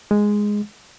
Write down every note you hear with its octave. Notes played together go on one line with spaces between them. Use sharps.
G#3